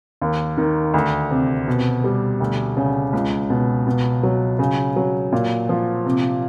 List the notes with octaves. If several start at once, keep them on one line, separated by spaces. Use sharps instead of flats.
D#2
D#3
D2
C3
B2
G3
D2
C#3
C#2
B2
B2
F#3
C#3
F#3
A#2
F3
C3